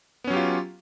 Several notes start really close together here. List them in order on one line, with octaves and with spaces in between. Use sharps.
B3 C#4 F#3 G4 F4